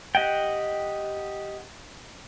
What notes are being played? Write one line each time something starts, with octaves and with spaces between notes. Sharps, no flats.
G4 D#5 F#5 G5